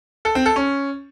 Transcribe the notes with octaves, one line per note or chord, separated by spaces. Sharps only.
A4
C4
A4
C#4